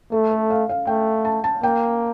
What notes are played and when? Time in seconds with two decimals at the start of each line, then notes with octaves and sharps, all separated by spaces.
0.12 A3 A4
0.31 A4
0.50 F5
0.69 F5
0.87 A3 G5
1.25 A5
1.44 A5
1.62 A#3 G5